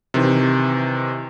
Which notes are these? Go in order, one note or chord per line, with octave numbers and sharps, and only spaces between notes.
C3 D#3 E3